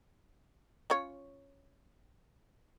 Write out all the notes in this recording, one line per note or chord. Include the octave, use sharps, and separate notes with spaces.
C#4 F4 C#5